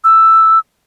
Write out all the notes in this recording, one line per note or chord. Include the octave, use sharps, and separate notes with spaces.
E6